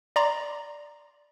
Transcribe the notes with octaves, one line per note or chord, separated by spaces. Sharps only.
D5 A#5 C6